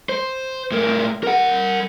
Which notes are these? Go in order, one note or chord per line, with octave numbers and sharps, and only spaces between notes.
C5
A2 A#4
A#4 F#5